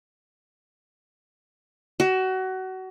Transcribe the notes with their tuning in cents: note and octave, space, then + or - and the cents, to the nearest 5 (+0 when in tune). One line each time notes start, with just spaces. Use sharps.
F#4 +25